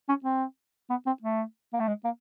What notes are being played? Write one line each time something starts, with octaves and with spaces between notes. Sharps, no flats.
C#4
C4
B3
C4
A3
A#3
A3
G#3
A#3